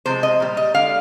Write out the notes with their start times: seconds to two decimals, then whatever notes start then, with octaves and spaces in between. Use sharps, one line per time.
0.06 C3 F3 G#3 C5
0.23 D#5
0.40 A#2 G3
0.57 D#5
0.74 D3 G#3 F5